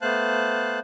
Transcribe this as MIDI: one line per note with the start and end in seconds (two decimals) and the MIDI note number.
0.02 0.79 57
0.02 0.79 59
0.02 0.79 72
0.02 0.79 77
0.02 0.79 81
0.02 0.79 90